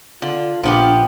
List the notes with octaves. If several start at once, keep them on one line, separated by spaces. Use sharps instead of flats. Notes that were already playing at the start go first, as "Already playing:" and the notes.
D3 F4
A#1 F3 B3 D4 F4 G4